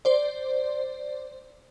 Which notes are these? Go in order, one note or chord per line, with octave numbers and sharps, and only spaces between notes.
C5 D5